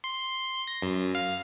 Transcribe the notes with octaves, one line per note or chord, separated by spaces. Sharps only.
C6
A#6
F#2
F5